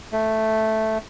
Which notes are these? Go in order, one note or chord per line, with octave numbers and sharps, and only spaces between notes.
A3